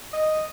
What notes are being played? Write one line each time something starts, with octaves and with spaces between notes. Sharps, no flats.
D#5